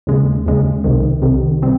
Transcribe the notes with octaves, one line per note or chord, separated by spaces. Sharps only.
D#2 C#3 G#3
D#2 C#3 G#3
C2 C3 D#3
C2 C3 D#3
C3 G3 C4